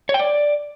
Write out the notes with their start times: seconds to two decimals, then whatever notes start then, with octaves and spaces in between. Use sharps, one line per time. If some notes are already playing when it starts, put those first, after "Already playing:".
0.09 C#5
0.14 G5
0.19 D5